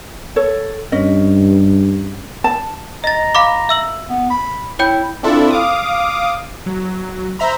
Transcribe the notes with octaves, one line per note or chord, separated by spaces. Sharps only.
A4 C#5
G2 C#4 D#5
A5
D#5 A#5 A6
F5 B5 D6
E5 E6 F#7
B3
B5
E4 C#5 G5 G6
C4 D4 E4 F4 A4
F5 D6 D#6
F#3
C5 E5 A#5 B5